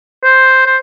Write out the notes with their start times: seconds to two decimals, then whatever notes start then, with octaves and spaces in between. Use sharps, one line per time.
0.23 C5
0.66 C5